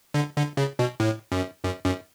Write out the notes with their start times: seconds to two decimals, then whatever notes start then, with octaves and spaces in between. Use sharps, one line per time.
0.14 D3
0.36 D3
0.57 C#3
0.79 B2
1.00 A2
1.32 F#2
1.64 F#2
1.85 F#2